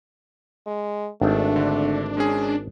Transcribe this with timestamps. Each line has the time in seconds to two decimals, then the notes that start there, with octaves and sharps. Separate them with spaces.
0.67 G#3
1.22 G#1 A3 D4
1.56 D3
2.17 G#3 C#4 G#4